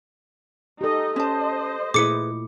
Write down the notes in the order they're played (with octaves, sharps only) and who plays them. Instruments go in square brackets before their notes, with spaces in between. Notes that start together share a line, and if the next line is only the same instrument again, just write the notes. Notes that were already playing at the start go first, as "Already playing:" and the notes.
[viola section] D#4 D#5 [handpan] G4 A4
[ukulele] C#4 A5 [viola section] C5 D#5
[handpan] A#2 A3 E4 [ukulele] G#4 B4 [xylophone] D6 C#7